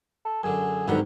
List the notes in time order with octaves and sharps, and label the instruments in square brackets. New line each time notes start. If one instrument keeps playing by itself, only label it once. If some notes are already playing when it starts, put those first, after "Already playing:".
[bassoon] A4
[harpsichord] F#2 D3 [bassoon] G#4
[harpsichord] C2 G#2 G5 [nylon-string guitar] D3 D#3 F#3 [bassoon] B3